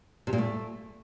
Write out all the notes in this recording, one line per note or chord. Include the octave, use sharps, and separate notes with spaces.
C3
A#2
A3